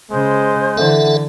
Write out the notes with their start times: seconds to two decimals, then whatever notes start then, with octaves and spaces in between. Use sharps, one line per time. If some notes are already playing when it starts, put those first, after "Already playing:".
0.11 C#3 G#3 C5
0.78 D3 E3 A4 E5 F#5